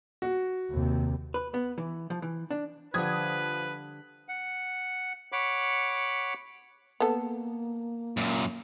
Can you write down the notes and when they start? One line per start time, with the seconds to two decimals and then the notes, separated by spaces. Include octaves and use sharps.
0.22 F#4
0.71 D#2 C3
1.34 B4
1.54 B3
1.78 E3
2.10 F3
2.22 E3
2.51 D4
2.94 D3 F3 G3 B4 D#6 G#6
4.28 F#5
5.32 C#5 F#5 B5 D6
7.00 A#3 B3 A4
8.17 F#2 A#2